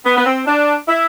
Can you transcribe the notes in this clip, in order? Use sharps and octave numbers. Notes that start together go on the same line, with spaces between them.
B3
B3
C4
D4
E4